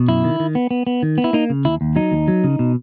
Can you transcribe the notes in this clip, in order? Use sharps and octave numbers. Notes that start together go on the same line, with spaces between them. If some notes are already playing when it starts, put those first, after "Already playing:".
Already playing: B2
F#2 E4
D#3
D#3
B3
B3
B3
D#3
B3
E4
A#3 D#4
C#3
D#2 E4
D#2
F#3 D#4
D#2
F#3
C#3
B2